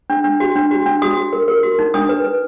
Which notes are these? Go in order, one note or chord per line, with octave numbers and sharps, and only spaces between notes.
D4
D4
F#4
D4
F#4
D4
F#4 D#6
F#4
A#4
A#4
F#4
D#4
D4 D#6
B4
B4